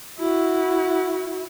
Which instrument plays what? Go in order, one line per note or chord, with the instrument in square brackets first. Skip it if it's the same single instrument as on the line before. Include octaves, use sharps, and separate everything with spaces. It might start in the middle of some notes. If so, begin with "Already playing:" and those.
[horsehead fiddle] E4 [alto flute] F#4